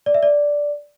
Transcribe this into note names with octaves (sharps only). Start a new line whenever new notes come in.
D5
E5
D5